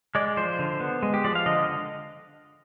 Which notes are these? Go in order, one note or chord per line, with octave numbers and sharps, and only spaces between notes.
G#3 D5
F3 C5
D3
B3
G#3
G4
F3 D5
F5
D3 D#5